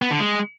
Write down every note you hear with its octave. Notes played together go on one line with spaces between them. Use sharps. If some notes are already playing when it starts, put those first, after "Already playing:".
B3
D3
G#3